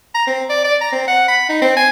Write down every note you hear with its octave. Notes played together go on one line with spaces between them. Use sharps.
A#5
C4
D5
D5
A#5
C4
F#5
B5
D#4
C4
G#5